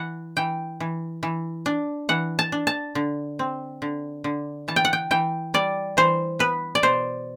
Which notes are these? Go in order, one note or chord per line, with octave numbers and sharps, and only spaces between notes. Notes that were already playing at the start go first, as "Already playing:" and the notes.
Already playing: E3 F#5
E3 G5
E3
E3
D4
E3 F#5
A5
D4
A5
D3
C4
D3
D3
E3 A5
G5
F#5
G5
E3 G5
G3 D5
E3 C5
B3 B4
D5
B2 C5